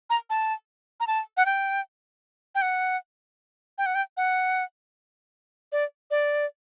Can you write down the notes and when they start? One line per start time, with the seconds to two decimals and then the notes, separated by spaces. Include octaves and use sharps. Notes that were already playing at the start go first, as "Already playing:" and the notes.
0.10 A#5
0.30 A5
1.00 A#5
1.07 A5
1.37 F#5
1.46 G5
2.55 G5
2.62 F#5
3.78 G5
3.86 F#5
3.95 G5
4.17 F#5
5.72 D5
6.11 D5